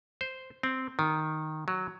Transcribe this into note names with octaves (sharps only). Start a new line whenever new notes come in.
C5
C4
D#3
F#3